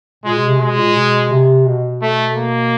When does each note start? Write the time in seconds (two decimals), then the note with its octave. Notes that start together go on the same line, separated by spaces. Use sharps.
0.24 A#2 G#3
0.37 B2
0.48 C3
0.59 B2 G#3
0.78 A#2
0.95 B2
1.30 C3
1.66 B2
2.02 A3
2.37 A#3